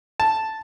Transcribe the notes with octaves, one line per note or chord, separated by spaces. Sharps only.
A5